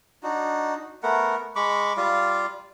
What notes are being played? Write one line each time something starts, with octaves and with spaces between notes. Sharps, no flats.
D4 D#4 F#4
A3 B3 A#4 F#5
G#3 B5 C#6 D6
G3 F4 D5 F5